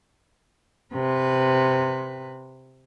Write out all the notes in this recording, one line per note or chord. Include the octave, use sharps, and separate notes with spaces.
C3 B4